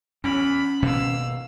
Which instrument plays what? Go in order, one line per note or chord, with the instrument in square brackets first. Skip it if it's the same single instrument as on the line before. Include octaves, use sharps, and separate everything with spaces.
[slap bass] E2 [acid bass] C#4 [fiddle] B5
[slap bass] G#1 B2 A#3 [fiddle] F5 E6